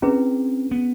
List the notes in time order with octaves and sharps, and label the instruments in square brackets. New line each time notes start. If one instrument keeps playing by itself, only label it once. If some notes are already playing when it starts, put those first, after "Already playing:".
[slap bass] C4 [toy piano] C#4 E4 G#4 B4
[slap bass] B3